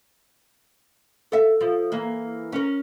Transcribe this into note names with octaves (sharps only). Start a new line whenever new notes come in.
A4 E5
F3
E3 A#3
C#4 A#4